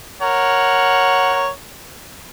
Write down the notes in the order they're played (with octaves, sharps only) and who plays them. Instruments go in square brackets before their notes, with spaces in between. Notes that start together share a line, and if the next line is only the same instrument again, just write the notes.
[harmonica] A#4 C#5 F#5